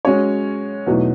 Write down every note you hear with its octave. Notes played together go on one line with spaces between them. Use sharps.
G#3 C#4 F#4 C#5
E2 B2 F#3 A3 D#4